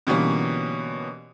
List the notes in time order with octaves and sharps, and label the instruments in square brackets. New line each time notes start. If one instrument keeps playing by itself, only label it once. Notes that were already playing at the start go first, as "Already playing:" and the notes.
[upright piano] B2 D3 E3 G3 A#3 C#4